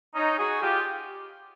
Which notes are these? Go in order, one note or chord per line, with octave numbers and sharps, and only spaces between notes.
C#4 D#4
F#4 G#4
F4 G4